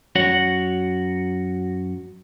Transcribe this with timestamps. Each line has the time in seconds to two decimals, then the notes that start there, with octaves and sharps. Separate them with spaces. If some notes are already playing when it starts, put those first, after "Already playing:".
0.15 F#2 F#4 C#5 F#5